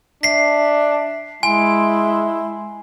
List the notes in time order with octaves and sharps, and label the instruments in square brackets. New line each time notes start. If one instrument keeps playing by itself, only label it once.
[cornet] D4 [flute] E5 [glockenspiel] B6 C7
[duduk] G#3 [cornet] E4 [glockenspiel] G#5 [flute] C6